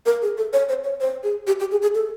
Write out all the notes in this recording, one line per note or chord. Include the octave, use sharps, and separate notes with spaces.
A#4
G#4
A4
C#5
C5
C#5
C5
G#4
G4
G4
G#4
G#4
A4